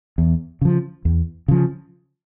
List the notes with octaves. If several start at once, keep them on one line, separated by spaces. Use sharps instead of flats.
E2
C#3 F3
E2
C#3 F3